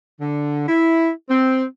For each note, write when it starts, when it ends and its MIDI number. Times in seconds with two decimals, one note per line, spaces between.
0.21 0.65 50
0.68 1.10 64
1.30 1.64 60